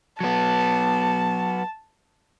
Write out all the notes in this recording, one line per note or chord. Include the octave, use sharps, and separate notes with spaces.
F#3 B3 A5